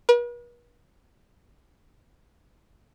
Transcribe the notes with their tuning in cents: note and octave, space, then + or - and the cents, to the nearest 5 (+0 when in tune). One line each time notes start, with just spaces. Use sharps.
B4 -45